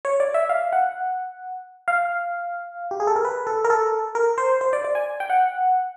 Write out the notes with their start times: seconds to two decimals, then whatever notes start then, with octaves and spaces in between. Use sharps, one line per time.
0.05 C#5
0.20 D5
0.34 E5
0.49 F5
0.73 F#5
1.88 F5
2.91 G4
3.00 G#4
3.07 A4
3.16 A#4
3.25 B4
3.47 A4
3.65 A#4
3.70 A4
4.15 A#4
4.38 C5
4.61 C5
4.73 D5
4.84 D5
4.95 G#5
5.20 G5
5.30 F#5